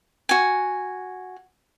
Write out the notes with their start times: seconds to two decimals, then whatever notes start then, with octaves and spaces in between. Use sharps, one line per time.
0.29 F#4 G#5